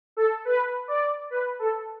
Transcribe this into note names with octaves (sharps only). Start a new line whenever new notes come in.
A4
B4
D5
B4
A4